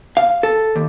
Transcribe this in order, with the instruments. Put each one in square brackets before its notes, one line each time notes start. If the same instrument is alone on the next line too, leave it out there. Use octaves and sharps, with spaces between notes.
[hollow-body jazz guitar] F5
A4
D#2